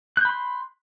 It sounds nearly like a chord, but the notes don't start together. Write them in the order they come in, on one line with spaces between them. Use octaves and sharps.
F#6 G6 B5 C6